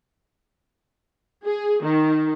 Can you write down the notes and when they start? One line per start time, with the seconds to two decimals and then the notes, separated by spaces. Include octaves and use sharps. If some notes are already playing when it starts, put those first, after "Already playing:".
1.45 G#4
1.83 D#3